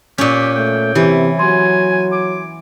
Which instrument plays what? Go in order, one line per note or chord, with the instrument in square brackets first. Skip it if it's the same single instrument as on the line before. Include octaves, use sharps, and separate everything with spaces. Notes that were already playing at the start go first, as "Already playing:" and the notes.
[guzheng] A#2 C#4 [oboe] G4
[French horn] A3 [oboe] G5
[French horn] C3 [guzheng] E3 [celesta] E4 G4 B4
[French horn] F#3 [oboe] G#5 [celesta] C6
[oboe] D6